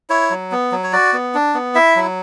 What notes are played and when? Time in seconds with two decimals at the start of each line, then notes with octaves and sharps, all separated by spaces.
0.10 E4 C#5
0.30 F#3
0.52 B3
0.72 F#3
0.83 C#5
0.93 F#4 D5
1.13 B3
1.35 D4
1.54 B3
1.75 E4 E5
1.96 F#3